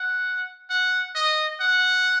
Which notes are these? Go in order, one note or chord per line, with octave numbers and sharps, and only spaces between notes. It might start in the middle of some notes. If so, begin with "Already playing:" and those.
Already playing: F#5
F#5
D#5
F#5